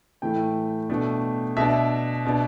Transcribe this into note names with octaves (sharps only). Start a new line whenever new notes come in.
A2 E3 A3 G5
B2 A3 D4
B2 B3 D4 E5
B2 B3 D4